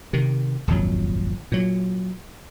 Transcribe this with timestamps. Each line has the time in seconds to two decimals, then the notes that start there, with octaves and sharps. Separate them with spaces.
0.13 C3 D#3
0.68 D#1 G#1 F2 F#3
1.52 A#2 F#3